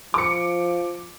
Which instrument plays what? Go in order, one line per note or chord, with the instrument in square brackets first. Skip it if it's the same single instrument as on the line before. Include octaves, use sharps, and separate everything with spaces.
[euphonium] F3 [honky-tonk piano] D6 C#7